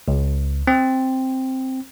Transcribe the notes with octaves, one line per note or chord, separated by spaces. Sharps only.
C#2
C4